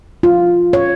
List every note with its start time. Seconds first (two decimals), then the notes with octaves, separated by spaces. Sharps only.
0.23 F4
0.73 C#5